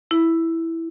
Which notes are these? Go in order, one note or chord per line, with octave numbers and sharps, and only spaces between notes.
E4